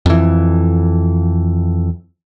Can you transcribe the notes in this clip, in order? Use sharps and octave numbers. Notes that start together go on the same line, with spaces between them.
F2 E3